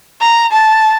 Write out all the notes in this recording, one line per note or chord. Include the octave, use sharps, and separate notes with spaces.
A#5
A5